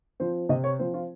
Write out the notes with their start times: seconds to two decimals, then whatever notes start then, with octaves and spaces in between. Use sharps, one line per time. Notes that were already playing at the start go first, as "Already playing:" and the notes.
0.20 F3 C4 C5
0.49 C3 D#5
0.64 C#5
0.79 F3 C4 C5
0.94 F4